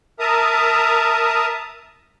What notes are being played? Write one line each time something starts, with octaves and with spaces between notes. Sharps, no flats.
A#4 E5 A5 A#5 D#6